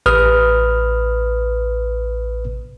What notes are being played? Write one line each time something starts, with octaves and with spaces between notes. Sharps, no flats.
A1 B4 D#6 F6